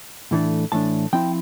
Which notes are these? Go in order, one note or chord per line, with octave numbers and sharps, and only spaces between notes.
A2 E3 A3 D4
A2 E3 A3 D4 A5
F3 C4 E4 G5